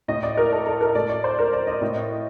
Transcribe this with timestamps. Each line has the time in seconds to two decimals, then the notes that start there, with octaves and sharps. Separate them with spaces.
0.08 A2 D#5
0.23 D5
0.37 A#4
0.52 A4
0.67 A4
0.81 A#4
0.95 A2 D5
1.10 D5
1.24 C5
1.39 A#4
1.53 D5
1.67 D#5
1.81 A2